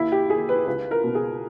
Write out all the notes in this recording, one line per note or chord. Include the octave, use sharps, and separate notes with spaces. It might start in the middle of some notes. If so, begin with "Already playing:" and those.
Already playing: D#2 E4
G4
D#2 G#4
B4
C#2 B4
A#4
B2
G#4